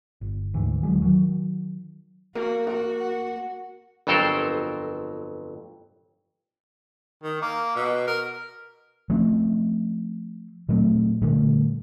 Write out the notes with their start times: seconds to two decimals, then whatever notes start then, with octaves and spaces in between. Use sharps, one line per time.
0.21 G1
0.54 D2 G#2 E3
0.83 D#1 D3 F#3 G#3
1.02 D#3 F#3
2.35 A#3 F#4 A#4
2.67 F#4 A#4
3.00 F#5
4.07 G1 F2 F#3 A4 A#4 C5
7.23 D#3
7.42 A#3
7.76 B2
8.07 A#4
9.10 F3 A3 C4 C#4
10.69 A#2 F#3 A3 C4
11.22 A#2 D3 G3 A3